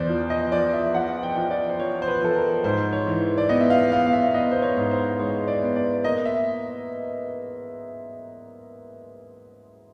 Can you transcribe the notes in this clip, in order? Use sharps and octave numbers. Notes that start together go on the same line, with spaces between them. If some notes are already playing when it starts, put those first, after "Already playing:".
Already playing: E2 C5 D5
F3
D#5
F3 D5
E5
F3 F#5
G5
F3
D5
C5
F3 C#5
C5
B4
F3 A4
A#4
G#2 C5
C#5
E3
D5
B3 D#5
E5
F5
B3 F5
F5
E5
B3 D#5
C5
C#5
G#2
C5
G#3 C#5
D5
B3
D5
A#3 D#5
E5